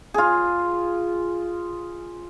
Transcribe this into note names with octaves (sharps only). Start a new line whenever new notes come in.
F4 G#4